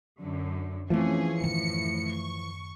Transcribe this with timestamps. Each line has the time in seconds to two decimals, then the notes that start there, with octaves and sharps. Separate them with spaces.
0.19 F#2 D3
0.90 E3 F3 A3 C4 C#4 G#4
1.41 F#2 A2 D#3 C#7
2.12 C#6